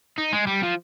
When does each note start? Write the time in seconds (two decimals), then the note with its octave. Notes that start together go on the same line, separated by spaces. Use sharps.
0.18 D#4
0.33 G#3
0.47 G3
0.63 F3